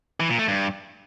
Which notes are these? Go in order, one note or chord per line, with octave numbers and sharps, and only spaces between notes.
E3
A#2
A3
G2